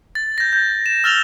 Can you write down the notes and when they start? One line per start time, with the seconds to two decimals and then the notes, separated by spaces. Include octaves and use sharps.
0.15 A6
0.38 G6 A#6
0.53 G6
0.86 E7
1.04 E6 F6 A6 F7 G7